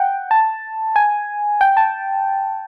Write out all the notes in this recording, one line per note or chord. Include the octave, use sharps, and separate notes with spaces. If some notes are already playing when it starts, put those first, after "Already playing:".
Already playing: F#5 G5
A5
G#5
G5
A5